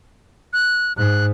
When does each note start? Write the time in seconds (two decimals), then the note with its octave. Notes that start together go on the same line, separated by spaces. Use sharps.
0.53 F#6
0.97 G#2 F#6